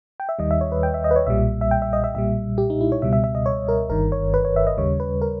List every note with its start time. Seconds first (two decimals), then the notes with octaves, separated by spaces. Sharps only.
0.20 G5
0.29 E5
0.39 D#2 D#3 G3 D#5
0.51 E5
0.61 C#5
0.72 B4
0.83 G5
0.94 E5
1.04 D#5
1.11 B4
1.16 C#5
1.27 B1 A#2 G3 E5
1.61 E5
1.71 G5
1.82 E5
1.93 D#5
2.04 E5
2.15 B1 A#2 G3 E5
2.58 G4
2.70 D#4
2.81 E4
2.92 C#5
3.02 C#2 B2 G3 E5
3.13 E5
3.24 E5
3.35 D#5
3.46 C#5
3.68 A#4
3.89 G1 G2 D#3 A#4
4.12 C#5
4.34 B4
4.45 C#5
4.56 E5
4.67 D#5
4.78 D#2 C#3 G3 C#5
5.00 B4
5.22 A#4